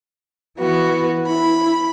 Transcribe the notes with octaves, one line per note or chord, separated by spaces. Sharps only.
E3 B3 F#4
E4 B5